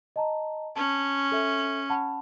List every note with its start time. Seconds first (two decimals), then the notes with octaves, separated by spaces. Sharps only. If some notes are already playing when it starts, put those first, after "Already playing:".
0.16 D#5 A5 A#5
0.76 C#4 A5
1.32 A4 E5
1.90 F#5 A5 B5